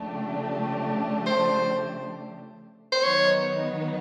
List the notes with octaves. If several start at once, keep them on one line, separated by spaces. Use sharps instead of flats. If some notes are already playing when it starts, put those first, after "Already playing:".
Already playing: C#3 F3 A3 D4 G4
C5
C5
D#3 F#3 B3 D#4 C#5